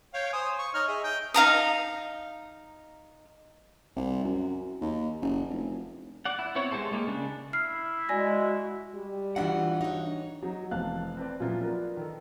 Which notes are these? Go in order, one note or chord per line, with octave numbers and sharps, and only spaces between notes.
C#5 F5 G5
C5 G#5 D#6
C#6
D#4 C#5 F6
G#4 D#5 E5
D#4 G5
D#4 F5 A#5 D#6
C2
F#2
D#2
F#1
F1
D5 F#5
E4
B3 C4 E4 C#5
G#3 E4 G4 A4 C5
G#3 A#3 G4
C#3 D4
E4 F6 C7
G#3 F#4 D5 G#5 A#6
G3
G2 E3 D4 F4 F#4 F#5
D#4 C#5
F#3 D#4
F1 E3 C4 F5 A5 F#6
C4 B4 D5
A#2 F3 F#3 A#3 E4 F4
D4 F4 A#4 B4
D#3 A4